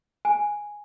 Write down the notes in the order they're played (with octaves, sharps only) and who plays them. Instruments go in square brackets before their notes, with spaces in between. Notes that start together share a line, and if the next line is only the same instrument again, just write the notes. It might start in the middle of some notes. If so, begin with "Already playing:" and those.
[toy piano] G#5